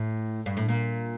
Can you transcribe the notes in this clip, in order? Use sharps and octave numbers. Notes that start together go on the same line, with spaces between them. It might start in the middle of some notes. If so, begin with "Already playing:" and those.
Already playing: A2
G2
A2
A#2